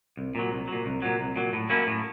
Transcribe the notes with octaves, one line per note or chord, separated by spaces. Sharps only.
C2
A#2 F#3
C2
A#2 F#3
C2
A#2 F#3
C2
A#2 F#3
A2
F#3 A#3 C#4 E4
A2